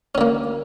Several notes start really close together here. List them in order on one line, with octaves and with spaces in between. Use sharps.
C#4 D3 A#3